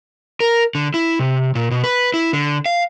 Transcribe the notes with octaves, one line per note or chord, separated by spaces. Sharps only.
A#4
D3
E4
C3
A#2
B2
B4
E4
D3
F5